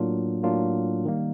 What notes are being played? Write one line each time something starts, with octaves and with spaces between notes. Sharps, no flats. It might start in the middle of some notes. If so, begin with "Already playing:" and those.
Already playing: A2 F#3 A#3 D4 F4
A2 F#3 A#3 D4 F4
D#3 G3 A#3